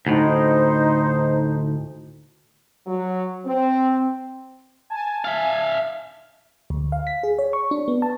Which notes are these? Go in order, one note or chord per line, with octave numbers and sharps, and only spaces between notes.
D2 A2 D#4 C5
F#3
C4
G#5 A5
E5 F5
D2
F5
B6
G#4
C#5
C#6
D4
B3
A5